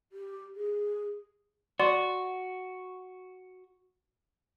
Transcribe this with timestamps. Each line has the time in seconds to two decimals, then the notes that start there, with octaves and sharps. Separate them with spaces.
0.12 G4
0.56 G#4
1.80 F#4 D5 C6